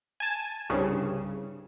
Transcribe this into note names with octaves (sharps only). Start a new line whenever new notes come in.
G#5 A5
C2 G2 C#3